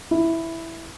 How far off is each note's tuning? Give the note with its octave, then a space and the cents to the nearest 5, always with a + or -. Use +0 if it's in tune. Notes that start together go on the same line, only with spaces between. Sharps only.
E4 +0